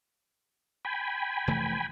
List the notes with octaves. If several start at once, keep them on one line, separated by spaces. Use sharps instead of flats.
G5 G#5 B5
F1 E3 A3